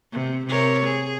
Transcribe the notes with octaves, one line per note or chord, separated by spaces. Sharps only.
C3
C3 A#4 C#5
G#4